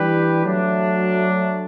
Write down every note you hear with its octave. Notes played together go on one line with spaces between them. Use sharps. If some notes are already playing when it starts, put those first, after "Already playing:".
Already playing: E3 G3 D4 G4 B4
F#3 A3 D4